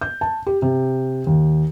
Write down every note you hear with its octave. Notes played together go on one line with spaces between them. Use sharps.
G6
A5
G4
C3
D#2